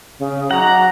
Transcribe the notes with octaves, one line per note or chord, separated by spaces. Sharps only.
C#3
F#3 D#4 D5 F#5 A#5